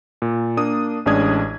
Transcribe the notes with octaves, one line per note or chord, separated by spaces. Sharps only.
A#2
A#3 D4 D#6
A1 G#3 C#4 D4 D#6 G#6